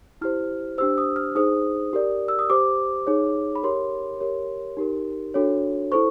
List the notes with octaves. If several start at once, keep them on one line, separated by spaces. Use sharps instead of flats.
E4 G4 C5 F6
D4 G4 C5 E6
D#6
F6
D#4 G#4 C5 D#6
G4 A#4 D5
E6
D#6
G4 C5 D6
D#4 G#4 C#5
B5
G4 A#4 C#5 C6
G4 A#4 C#5
D#4 G4 A#4
D4 F#4 A4 C#5
E4 A4 C5 C#6